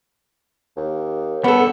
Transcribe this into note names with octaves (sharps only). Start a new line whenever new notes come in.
D#2
G2 B3 A4